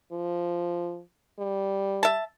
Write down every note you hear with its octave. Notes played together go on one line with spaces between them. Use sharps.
F3
G3
E5 A5